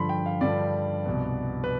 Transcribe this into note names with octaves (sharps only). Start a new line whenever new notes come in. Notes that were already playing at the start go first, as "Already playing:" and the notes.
Already playing: G2 D3 F3 B5 C6
G5
F5
G2 D3 F3 D5
C2 B2 B3
B4